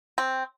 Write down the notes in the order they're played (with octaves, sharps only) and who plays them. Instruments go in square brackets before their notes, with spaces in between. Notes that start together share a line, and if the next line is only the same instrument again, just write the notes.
[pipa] C4